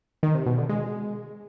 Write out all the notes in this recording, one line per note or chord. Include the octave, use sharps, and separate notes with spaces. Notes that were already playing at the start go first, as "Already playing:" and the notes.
D#3
C3
B2
D3
G#3